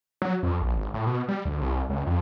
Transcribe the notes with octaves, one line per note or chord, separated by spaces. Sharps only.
F#3
F2
A#1
G#1
A2
B2
G3
D2
C2
C#2
F2